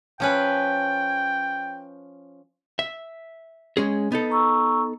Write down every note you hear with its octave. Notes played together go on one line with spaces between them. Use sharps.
F3 C#4 B4 G5
E5
G#3 C#4 G#4
B3 D#4 A4
A#5 C#6 E6